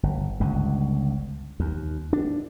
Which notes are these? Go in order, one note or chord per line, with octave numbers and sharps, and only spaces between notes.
G1
G1 C#2 G2
D#2
D4